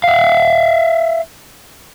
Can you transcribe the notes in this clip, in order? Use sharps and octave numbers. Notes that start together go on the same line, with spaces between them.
E5 F5